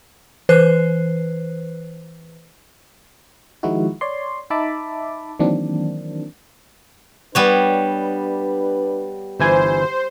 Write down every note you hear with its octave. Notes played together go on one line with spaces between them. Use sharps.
E3 B4 C5 F#6 C7
D#3 F3 G#3 D#4 E4 F#4
C#5 D5 C6
D#4 E5 A5 B5 D6
D#3 E3 F#3 A#3 C4 D4
G3 B3 D4 B4 C#5
G1 E3 C5 G#5